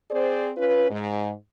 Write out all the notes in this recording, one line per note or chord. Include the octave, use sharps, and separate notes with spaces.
C4 G#4 C5 D5
C#4 F4 B4
G#2